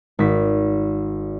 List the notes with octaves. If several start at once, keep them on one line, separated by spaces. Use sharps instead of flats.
G#1 B6